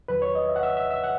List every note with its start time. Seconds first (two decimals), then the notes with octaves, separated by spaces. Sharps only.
0.08 E2 D#3 F#3 B4
0.22 C#5
0.35 D#5
0.49 E5
0.56 F#5
0.63 E5
0.77 E5
0.91 E5
1.04 F#5